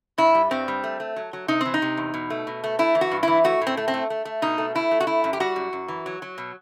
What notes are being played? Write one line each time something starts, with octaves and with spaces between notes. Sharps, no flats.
G2 E4
G3
G2 C4
G3
A3
A3
F#3
F#3
C3 D#4
E3 C4
D#4
C3
E2
B2
A3
B2
A3
A3 E4
E3
F#4
G2
E3 E4
A3 F#4
A2
C4
A3
C4
A3
A3
A3
B2 D#4
A3
A3 E4
A3
F#4
A3 E4
F#2
G4
G3 F#4
F#2
F#2
E3
F#3
F#3
B2